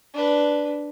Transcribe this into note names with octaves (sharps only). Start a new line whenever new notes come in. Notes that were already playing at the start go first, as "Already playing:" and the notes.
D4 B4